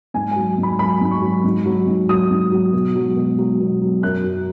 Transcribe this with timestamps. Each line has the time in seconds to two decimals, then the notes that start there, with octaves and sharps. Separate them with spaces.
0.14 G#2 G#5
0.32 G#5
0.36 F#3
0.58 G#2
0.63 B5
0.79 F#3 B5
1.01 G#2
1.11 C#6
1.22 F#3
1.44 G#2
1.66 F#3
1.87 G#2
2.09 F#3 D#6
2.31 G#2
2.52 F#3
2.73 B2
2.95 F#3
3.16 B2
3.38 F#3
3.60 B2
3.82 F#3
4.02 F#2 F#6
4.24 F#3